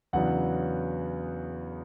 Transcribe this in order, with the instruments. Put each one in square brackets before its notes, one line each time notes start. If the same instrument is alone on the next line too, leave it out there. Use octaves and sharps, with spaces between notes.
[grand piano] E2 C#3 F#3 B3 D4 F#5